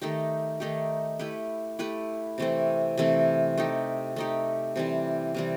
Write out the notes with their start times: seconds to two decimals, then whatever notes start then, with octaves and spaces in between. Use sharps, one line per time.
0.01 D#3 A3 D#4 G4
0.60 D#3 A3 D#4 G4
1.19 A3 E4 G4 B4
1.79 A3 E4 G4 B4
2.38 C3 E3 A3 C4
2.98 C3 E3 A3 C4
3.58 A3 D#4 G4
4.16 A3 D#4 G4
4.76 C3 E3 G3 C4
5.34 C3 E3 G3 C4